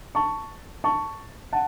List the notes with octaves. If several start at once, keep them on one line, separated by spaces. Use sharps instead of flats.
A5 C#6
A5 C#6
F#5 A5